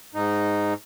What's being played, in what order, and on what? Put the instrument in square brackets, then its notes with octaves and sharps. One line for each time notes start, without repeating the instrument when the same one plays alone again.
[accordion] G#2 D#4